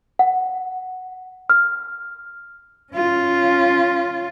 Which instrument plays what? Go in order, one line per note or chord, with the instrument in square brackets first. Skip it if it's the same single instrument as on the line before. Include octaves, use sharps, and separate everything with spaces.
[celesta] F#5
F6
[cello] C#4 F4